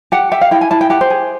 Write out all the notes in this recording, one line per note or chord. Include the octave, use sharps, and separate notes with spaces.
G4 F#5
G4 E5
F5
E4 G5
G#5
E4 A5
G5
G4 F#5
C5
G#4